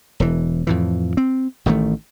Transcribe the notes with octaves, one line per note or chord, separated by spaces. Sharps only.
E1 E3
F2 A2 E3
C4
A1 D#3 F#3 A3